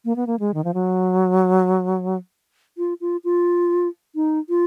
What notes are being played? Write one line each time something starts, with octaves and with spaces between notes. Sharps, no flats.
A#3
B3
A#3
G#3
D#3
F3
F#3
F4
F4
F4
D#4
F4